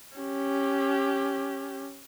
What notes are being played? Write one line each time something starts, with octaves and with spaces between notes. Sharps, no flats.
C#4 G4